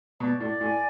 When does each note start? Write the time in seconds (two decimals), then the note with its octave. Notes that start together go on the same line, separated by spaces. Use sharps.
0.20 B2 D5
0.40 A2 D5
0.61 A2 G#5